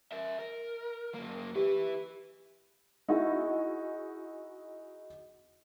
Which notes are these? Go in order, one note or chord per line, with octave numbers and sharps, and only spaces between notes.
A#4 E5
A#4
F#2 A#3
E4 G4 B4
D#4 E4 F#4 G#4